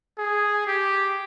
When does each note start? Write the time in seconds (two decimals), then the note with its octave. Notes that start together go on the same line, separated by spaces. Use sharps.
0.18 G#4
0.67 G4